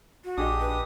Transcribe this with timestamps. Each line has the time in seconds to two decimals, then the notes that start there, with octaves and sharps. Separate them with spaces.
0.24 F#4
0.37 A#1 D4 G4 G#4 D#5 D#6
0.61 B4